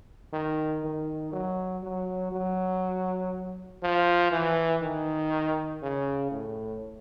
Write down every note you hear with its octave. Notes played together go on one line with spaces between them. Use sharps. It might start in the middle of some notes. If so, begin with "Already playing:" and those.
D#3
D#3
F#3
F#3
F#3
F3
E3
D#3
C#3
A2